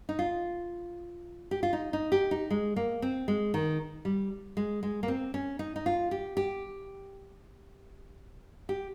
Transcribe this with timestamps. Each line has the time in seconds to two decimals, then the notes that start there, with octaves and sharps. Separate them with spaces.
0.09 D#4
0.19 F4
1.51 G4
1.63 F4
1.73 D#4
1.93 D#4
2.12 G4
2.31 D#4
2.50 G#3
2.76 A#3
3.02 C4
3.28 G#3
3.54 D#3
4.05 G3
4.57 G#3
4.83 G#3
5.03 A#3
5.08 C4
5.34 C#4
5.59 D#4
5.76 D#4
5.86 F4
6.11 G4
6.37 G4
8.69 G4